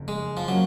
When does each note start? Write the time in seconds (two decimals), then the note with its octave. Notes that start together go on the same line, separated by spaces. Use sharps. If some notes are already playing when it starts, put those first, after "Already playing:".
Already playing: F#1 F2 F3
0.08 G#3
0.37 F3
0.48 F3 F#3 A#3 C#4